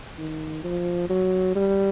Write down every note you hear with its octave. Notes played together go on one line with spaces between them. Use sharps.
D#3
F3
F#3
G3